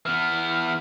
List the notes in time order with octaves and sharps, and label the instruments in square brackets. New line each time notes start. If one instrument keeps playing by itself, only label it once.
[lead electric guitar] E3 B3 [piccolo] F6